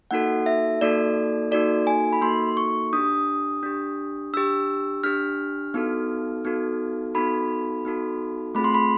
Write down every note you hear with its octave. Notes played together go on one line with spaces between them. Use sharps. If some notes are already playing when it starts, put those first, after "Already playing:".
A#3 D#4 F#4 A4 F#5
E5
A#3 D#4 F#4 A4 D5
A#3 D#4 F#4 A4 D5
G#5
B5
A#3 D#4 F#4 A4 C6
C#6
D4 G4 D#6
D4 G4
D4 G4 E6
D4 G4 F6
B3 D#4 F#4 A4
B3 D#4 F#4 A4
B3 D#4 F#4 A4 B5
B3 D#4 F#4 A4
A3 C4 F4 G#4 B5
C6
B5